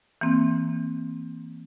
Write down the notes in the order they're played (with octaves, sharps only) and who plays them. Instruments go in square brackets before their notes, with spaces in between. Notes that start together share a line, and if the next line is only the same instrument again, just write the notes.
[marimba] E3 A#3 C4